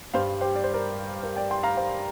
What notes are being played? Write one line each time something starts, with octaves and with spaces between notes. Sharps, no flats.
G2 G3 C5 F5
G4 C5
D5
C5
A#4 D5
A#4
D5 G5
G5 C6
F5 A#5
C5 F5